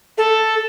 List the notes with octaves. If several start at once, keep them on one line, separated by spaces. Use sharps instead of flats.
A4